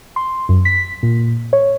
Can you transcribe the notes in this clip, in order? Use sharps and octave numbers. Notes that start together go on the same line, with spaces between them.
C6
F#2
B6
A#2
C#5